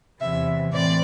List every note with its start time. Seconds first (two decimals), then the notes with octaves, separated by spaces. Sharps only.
0.20 E2 C3 E3 E5
0.73 A2 E3 C4 D5